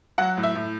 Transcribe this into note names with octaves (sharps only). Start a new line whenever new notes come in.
F#3 F#5
A2
E5
A2